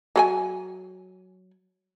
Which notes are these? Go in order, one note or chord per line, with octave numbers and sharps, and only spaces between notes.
F#3 A4 G#5